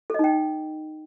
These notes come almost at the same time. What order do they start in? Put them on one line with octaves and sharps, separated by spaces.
A4 D#5 D#4 G5